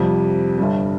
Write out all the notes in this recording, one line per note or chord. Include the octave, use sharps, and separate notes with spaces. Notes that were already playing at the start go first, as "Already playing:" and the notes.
Already playing: F2 C3 G3
G1 G2 G3